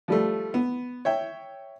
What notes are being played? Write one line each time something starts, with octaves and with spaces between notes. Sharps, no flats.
F3 G3 A3
B3
C#5 E5 G5